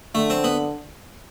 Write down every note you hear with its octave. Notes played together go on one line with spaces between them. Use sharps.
D3 A3
C4
B3